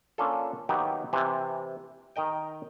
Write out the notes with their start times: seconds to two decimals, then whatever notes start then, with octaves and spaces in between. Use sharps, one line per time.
0.18 A#3 C#4 D4 F4 A4
0.69 D#3 F#3 A#3 B3 D#4 G4
1.13 C3 E3
2.16 D#3 A#4 D#5 G5